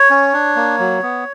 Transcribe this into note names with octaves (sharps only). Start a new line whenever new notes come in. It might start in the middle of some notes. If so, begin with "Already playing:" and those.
Already playing: C#5
C#4
D4
A#3
F#3
B3